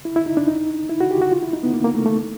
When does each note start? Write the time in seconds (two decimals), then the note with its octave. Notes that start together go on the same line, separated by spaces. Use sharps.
0.05 E4
0.16 E4
0.26 D#4
0.37 D4
0.48 D#4
0.90 E4
1.00 F#4
1.11 G4
1.21 F#4
1.32 F4
1.43 E4
1.53 D#4
1.63 B3
1.74 A#3
1.84 A#3
1.95 A3
2.06 A3